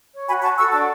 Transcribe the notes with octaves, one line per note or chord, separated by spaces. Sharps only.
C#5
F#4 G#5 B5
F#4 A5 C#6
A4 C#6 E6
D4 A5 C#6